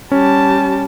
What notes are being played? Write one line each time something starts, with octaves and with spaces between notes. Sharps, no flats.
G3 C#4 A5